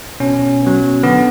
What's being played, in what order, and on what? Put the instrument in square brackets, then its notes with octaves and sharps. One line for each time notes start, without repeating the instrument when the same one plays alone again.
[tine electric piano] B2 C#4
F#3 B3
D3 B3